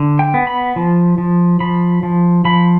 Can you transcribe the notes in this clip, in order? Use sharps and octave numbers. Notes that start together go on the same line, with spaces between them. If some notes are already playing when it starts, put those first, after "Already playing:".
Already playing: D3
G5
B3
B5
F3
F3
F3 B5
F3
F3 B5